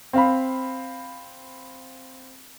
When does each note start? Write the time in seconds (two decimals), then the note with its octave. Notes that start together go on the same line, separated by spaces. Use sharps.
0.13 C4 F5 B5